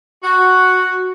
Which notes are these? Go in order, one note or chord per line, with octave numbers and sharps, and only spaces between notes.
F#4